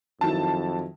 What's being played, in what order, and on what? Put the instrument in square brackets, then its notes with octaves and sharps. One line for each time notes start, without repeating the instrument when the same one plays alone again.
[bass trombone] F2 [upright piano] D#3 F#3 E4 [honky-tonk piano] A5